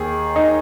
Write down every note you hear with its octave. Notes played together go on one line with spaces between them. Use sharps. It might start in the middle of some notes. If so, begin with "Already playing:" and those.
Already playing: D#2 D#3 G#4
D#4